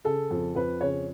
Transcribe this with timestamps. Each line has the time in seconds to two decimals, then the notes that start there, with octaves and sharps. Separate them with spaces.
0.04 C#3 A4
0.31 F2
0.55 F2 B4
0.81 C#3 C#5